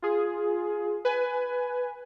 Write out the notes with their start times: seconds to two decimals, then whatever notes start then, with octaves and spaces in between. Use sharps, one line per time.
0.02 F4 G#4
1.05 B4 G#5